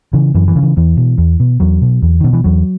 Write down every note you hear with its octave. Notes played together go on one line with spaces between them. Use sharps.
C#3 E3
F#2 E3
E3
C#3
E3
E2 E3
B2
E2
B2
E2 F#3
B2
E2
B2 D#3
E3
E2 F#3